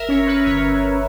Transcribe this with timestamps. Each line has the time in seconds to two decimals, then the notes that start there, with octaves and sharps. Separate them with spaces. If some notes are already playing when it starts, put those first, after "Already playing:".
Already playing: G1 A#4 E5
0.09 C#4 C#5
0.27 B4
0.45 G1 C#5